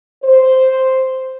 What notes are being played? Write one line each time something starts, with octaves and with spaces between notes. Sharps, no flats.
C5